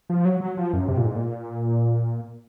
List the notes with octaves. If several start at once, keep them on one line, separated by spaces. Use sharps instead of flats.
F3
F#3
F#3
F3
F#2
C3
A#2
G#2
A#2